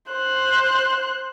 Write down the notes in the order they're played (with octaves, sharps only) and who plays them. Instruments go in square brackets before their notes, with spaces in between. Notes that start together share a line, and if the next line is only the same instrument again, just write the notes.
[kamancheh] C5 F#6